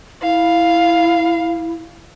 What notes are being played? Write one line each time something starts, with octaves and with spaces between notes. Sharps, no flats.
E4 F5